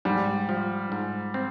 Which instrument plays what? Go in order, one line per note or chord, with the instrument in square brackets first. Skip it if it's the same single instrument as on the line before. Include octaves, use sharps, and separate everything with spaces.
[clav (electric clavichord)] G#2 [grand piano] G3
[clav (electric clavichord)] F3
G#2
C4